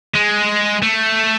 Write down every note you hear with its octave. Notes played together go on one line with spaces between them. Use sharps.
G#3
A3